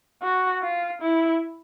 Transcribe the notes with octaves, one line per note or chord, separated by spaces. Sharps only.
F#4
F4
E4